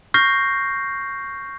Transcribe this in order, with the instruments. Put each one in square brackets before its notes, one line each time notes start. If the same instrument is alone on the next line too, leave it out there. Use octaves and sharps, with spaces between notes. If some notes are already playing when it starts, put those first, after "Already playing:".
[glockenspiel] C#6 F6 G6 A#6 C7